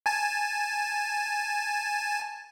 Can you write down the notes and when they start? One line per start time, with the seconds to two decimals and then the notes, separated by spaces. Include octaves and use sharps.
0.06 G#5 A5